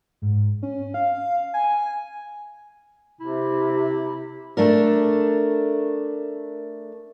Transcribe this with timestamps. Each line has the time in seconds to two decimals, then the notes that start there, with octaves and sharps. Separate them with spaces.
0.22 G#2
0.62 C#4
0.94 F5
1.54 G#5
3.21 C3 E4
4.57 A3 D4 A#4